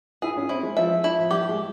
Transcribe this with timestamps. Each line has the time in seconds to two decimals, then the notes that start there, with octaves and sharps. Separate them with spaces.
0.22 E4 G#4
0.37 C#4
0.49 C4 E4
0.63 G#3
0.77 F3 E5
1.04 E4
1.19 F3
1.31 G3 G4
1.49 G#3